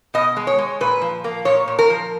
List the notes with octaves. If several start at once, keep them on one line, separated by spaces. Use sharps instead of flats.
B2 D#5
G#3
C#5
G#3
A#2 B4
F3
A#3
A#2 C#5
A#2
A#4
F3